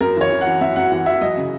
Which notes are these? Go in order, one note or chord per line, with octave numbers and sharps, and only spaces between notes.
F#2 A#4
E3 C#5
E3
F#5
E3
F#2 E5
F#2 F#5
E3 F#5
E3 E5
F#3 D#5
C#3